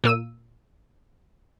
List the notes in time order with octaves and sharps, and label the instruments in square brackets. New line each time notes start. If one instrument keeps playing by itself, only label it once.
[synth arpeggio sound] A#2 A#3 E6 D#7